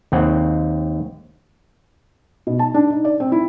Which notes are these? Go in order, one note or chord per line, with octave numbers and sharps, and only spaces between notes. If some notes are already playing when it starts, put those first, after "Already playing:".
D#2 C4 F#5
B2
A5
D4
D#4
D5
C4
E4